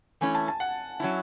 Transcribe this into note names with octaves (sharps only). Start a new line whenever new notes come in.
E3 A3 C#4 E4 G#5
A5
A5
F#5
F#3 C#4 E4